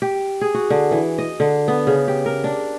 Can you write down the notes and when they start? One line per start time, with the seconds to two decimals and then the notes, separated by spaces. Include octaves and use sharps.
0.02 G4
0.41 G#4
0.54 F#4
0.70 D3
0.91 E3
1.18 D#5
1.40 D3
1.68 B3
1.87 C#3
2.08 G4
2.26 A#4
2.44 D4